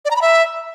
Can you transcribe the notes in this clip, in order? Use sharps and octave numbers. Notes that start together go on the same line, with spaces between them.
D5
A#5
B5
E5